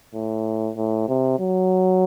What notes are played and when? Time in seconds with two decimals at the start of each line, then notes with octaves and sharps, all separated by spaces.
0.15 A2
0.76 A2
1.08 C3
1.40 F#3